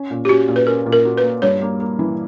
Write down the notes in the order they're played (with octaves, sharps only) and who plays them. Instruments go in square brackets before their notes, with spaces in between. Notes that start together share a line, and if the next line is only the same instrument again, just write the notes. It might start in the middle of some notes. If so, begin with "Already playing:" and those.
Already playing: [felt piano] C#4
A#2
[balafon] G4
[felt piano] C#4 [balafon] F#4
[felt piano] A#2
[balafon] B4
[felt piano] C#4 [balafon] A#4
[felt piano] A#2
[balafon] A#4
[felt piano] F#4
[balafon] B4
[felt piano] A#3
[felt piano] G2 [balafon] C#5
[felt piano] A#3
A#3
E3